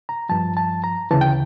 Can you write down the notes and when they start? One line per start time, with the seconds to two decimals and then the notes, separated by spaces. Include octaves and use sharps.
0.09 A#5
0.29 G2 F3 A5
0.57 A5
0.84 A#5
1.11 D2 C#3 E3 A5
1.21 G5